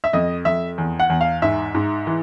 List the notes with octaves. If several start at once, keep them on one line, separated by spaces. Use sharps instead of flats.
E5
F2 D#5
F2 E5
E2
F#5
E2
F5
G#2 E5
G#2
E3